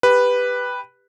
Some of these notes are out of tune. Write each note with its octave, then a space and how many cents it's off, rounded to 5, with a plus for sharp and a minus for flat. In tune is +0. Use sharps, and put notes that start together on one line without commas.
G4 +10 B4 +0